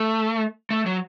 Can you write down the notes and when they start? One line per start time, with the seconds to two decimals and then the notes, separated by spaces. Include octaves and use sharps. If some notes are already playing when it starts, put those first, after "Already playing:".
Already playing: A3
0.70 A3
0.86 F#3